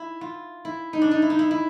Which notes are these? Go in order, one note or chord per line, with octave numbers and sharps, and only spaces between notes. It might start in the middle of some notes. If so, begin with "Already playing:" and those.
Already playing: E4
F4
E4
D#4
D4
D#4
E4
D#4
E4
E4